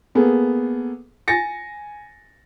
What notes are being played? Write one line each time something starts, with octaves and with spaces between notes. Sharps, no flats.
A#3 B3 G#4 A4
G#5 A6 A#6 C#7